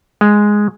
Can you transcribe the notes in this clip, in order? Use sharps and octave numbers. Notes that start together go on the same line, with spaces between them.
G#3